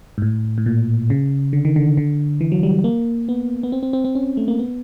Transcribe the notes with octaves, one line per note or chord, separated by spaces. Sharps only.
G#2
A2
A2
A#2
C#3
D3
D#3
D3
D3
E3
F#3
G3
A#3
B3
B3
C4
C4
C4
C4
C#4
A3
A#3
B3